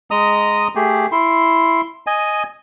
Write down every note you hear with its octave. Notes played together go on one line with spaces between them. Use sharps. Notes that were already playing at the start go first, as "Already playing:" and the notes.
G#3 D#5 A#5 D#6
A3 G4 G#4
E4 C6
D#5 G#5